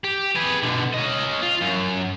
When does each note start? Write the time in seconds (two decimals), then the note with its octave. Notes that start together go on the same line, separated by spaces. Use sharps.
0.04 G4
0.35 G#4 B4
0.62 B2 D3
0.93 C#4 D#5
1.42 F4
1.61 F#2